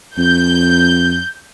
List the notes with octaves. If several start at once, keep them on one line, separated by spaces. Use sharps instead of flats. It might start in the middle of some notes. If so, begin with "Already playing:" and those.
F2 G6